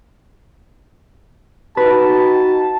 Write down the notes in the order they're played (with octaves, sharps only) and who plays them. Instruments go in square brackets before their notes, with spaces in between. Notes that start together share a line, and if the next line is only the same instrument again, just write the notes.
[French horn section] D#4 F#4 [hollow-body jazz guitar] B4 [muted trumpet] A5